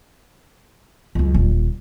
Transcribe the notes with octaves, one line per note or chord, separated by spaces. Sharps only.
C#2 F#2
D#1 D3